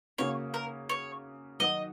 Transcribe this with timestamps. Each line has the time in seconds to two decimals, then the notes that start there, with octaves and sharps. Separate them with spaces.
0.18 C#3 A#3 C#4 F#4 C#5
0.54 A#4
0.89 C#5
1.60 D#3 F#3 D#4 F#4 D#5